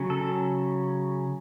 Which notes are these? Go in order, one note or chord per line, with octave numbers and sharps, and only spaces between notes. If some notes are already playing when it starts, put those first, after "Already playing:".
Already playing: C#3 F#3 C#4
A4